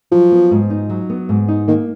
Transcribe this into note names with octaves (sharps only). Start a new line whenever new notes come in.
F3 F#3
B3
G#2
D#4
F#3
B3
G#2
D#4
D#3 A#3